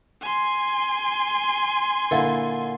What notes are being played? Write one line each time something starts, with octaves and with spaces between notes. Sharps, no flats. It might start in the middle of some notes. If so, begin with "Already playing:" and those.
G#5 C6
A#2 D3 E4